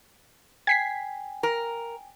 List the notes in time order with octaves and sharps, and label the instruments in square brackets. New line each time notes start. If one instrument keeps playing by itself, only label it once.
[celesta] G5 G#5 [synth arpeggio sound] G#6 B6 C7
[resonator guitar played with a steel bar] A#4